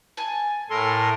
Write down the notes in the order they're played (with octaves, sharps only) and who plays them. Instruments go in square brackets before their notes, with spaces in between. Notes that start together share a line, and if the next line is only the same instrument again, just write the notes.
[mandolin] G#5 A5
[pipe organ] A2 A#4 C6 [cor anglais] A4